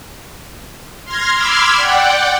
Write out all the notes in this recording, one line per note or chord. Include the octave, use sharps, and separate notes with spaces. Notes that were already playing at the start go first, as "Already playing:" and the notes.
C6 F6 G#6 A#6
B5 C6 D6 E6 F6 G#6
D5 F#5 G5